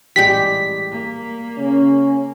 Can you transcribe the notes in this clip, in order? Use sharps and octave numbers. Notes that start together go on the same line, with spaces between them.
A1 G3 G#3 G4 B6
A#3
C#3 C#4